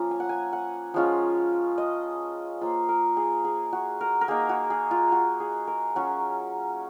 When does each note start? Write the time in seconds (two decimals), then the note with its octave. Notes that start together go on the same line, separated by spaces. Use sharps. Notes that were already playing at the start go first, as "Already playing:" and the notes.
Already playing: F3 A#3 C#4 F4 A#5
0.11 G#5
0.20 F#5
0.29 G#5
0.53 F#5
0.94 F3 G#3 C#4 F4
1.78 D#5
2.61 A#3 F4 C5
2.89 A#4
3.17 G#4
3.45 G#4
3.73 F#4
4.01 A#4
4.21 A#4
4.28 A#3 D#4 G#4
4.49 F#4
4.70 G#4
4.91 F4
5.12 F#4
5.40 G#4
5.67 A#4
5.95 F#3 C#4 F4 F#4